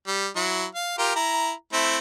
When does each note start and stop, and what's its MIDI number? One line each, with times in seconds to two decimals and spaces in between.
0.07 0.28 55
0.36 0.65 54
0.36 0.65 64
0.75 0.95 77
0.98 1.13 65
0.98 1.13 67
0.98 1.13 70
1.16 1.52 64
1.16 1.52 82
1.73 1.98 57
1.73 1.98 60
1.73 1.98 64